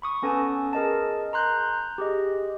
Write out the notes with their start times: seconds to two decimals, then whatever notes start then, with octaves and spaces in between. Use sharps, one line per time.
0.02 B5 C#6 D#6
0.22 B3 C#4 A4 B4 G#5 A5
0.73 G#4 A#4 D#5 A5
1.33 A#5 C6 F#6 G6
1.98 G4 G#4 D#5